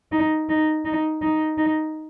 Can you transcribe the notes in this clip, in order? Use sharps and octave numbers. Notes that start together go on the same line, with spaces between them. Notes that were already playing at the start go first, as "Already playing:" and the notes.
D#4
D#4
D#4
D#4
D#4